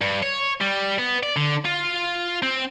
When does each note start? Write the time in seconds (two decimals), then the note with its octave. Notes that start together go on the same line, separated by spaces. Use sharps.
0.01 G2
0.22 C#5
0.61 G3
0.99 B3
1.23 D5
1.36 D3
1.65 F4
2.42 C4